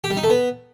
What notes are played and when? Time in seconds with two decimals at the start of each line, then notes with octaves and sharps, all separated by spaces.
0.04 G4
0.10 G3
0.17 D#4
0.23 A3
0.30 B3